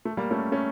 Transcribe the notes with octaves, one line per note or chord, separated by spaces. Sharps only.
A3
G3 A#3
A3 C#4
A3 C#4